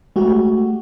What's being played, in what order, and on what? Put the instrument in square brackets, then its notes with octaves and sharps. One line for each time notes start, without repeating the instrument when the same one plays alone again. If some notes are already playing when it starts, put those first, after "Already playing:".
[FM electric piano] G#3 A3 F#4 G4